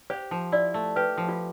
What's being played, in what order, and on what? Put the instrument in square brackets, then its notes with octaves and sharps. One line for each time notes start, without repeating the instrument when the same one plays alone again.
[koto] G4 [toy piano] C5
[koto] F3
[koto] E4 [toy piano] D5
[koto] A3
[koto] G4 [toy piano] B4
[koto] F3
[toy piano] F4